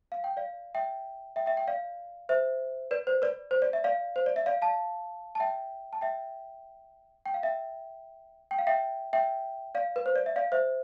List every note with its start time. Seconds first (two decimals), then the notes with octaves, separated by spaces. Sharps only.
0.12 F5
0.24 G5
0.37 D5 F5
0.74 E5 G5
1.36 E5 G5
1.46 E5 G5
1.57 E5 G5
1.68 D5 F5
2.29 C5 E5
2.91 B4 D5
3.07 C5
3.22 B4 D5
3.51 C5
3.62 D5
3.73 E5
3.84 D5 F5
4.16 C5
4.26 D5
4.36 E5
4.46 D5 F5
4.62 F5 A5
5.35 A5
5.40 E5 G5
5.93 A5
6.01 E5 G5
7.26 G5
7.34 F5
7.43 E5 G5
8.51 G5
8.59 F5
8.67 E5 G5
9.13 E5 G5
9.75 D5 F5
9.96 B4
10.06 C5
10.16 D5
10.26 E5
10.36 D5 F5
10.52 C5 E5